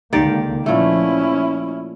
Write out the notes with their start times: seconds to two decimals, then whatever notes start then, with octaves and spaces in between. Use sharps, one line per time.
0.13 C#2 D3 D#3 A#3 G4 D5
0.66 A#2 F3 A3 C#4 E4